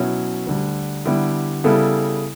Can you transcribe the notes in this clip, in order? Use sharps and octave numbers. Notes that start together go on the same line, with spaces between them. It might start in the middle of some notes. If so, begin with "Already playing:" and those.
Already playing: B2 F#3 C#4 E4
D2 D3 G3
D3 G3 B3 E4 G4
C#3 G3 B3 E4 A4